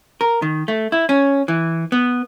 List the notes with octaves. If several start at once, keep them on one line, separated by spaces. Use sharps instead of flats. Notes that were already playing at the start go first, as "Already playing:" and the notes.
A#4
D#3
A3
E4
C#4
E3
B3